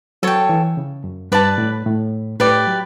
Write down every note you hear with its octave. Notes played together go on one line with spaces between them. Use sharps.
F#3 A4 C#5 G5
E3
C#3
F#2
G2 B4 D5 A5
A2
A2
A2 G4 B4 D5
F#3